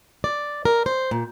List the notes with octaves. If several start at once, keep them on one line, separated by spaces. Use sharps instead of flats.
D5
A#4
C5
A#2